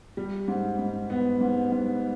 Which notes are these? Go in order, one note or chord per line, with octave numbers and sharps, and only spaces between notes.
G3
G#2
G#2
B3
G#2
G#2